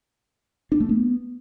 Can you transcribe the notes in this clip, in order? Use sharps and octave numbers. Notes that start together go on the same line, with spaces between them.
D4
A3
B3